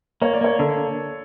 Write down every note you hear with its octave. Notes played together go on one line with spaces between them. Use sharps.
A#3 C#5
D5
A#3 C#5
D3 A4